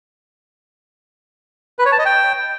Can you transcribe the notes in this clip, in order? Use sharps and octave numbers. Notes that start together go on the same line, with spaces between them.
B4
C#5
A5
D#5
G5